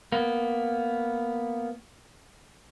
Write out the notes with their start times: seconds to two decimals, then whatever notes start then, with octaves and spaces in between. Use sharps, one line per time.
0.12 A#3 B3